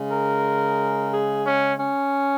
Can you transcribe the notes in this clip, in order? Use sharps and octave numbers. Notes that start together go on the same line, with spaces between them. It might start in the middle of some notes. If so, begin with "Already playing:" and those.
Already playing: C#3 G#3
A#4
G#4
C#4
C#4